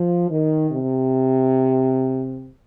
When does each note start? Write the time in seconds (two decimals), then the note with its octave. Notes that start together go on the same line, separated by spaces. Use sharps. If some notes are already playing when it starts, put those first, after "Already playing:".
Already playing: F3
0.29 D#3
0.71 C3